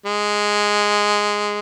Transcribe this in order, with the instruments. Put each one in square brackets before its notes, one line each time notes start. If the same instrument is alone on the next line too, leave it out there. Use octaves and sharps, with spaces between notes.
[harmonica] G#3